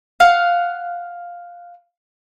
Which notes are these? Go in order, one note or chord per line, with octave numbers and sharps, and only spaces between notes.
F5 F#5